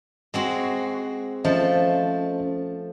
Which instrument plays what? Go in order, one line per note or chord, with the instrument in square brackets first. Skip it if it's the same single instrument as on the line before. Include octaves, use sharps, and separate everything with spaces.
[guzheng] G#3 C4 F#4
[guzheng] F3 A3 [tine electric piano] C#4 C5 D#5